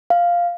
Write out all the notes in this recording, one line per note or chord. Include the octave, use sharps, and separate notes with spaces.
F5